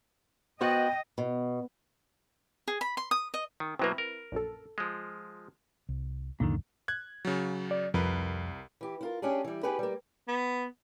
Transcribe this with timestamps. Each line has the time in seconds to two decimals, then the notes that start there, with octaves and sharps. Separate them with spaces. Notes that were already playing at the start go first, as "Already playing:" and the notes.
0.61 B3 F#4 C5 D#5 G5
1.18 B2
2.68 G#4
2.81 B5
2.97 C6
3.11 D#6
3.34 D#5
3.60 D#3
3.79 B2 F#3 A#3 C4 E4 B4
3.98 A#4
4.32 A#1 F#2 A4
4.78 F3 G#3
5.89 C2
6.40 C#2 F#2 A#2 D3 D#3
6.88 F#6 G#6
7.25 C#3 F#3
7.71 D5
7.94 C2 F2 A#4 B4
8.81 E3 G4
9.01 E4 F4 A#4
9.22 C#4 D4 G4 G#4
9.44 E3 G3
9.63 B3 D#4 G4 G#4 B4
9.79 G3 A#3
10.28 B3